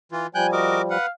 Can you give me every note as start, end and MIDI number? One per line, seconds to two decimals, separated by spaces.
0.12 0.27 52
0.12 0.27 65
0.35 0.97 53
0.35 0.97 55
0.35 0.47 79
0.35 0.51 80
0.35 0.47 90
0.35 0.47 91
0.52 0.82 66
0.52 0.82 70
0.52 0.79 75
0.52 0.82 86
0.90 1.06 71
0.90 1.09 77
0.90 1.06 78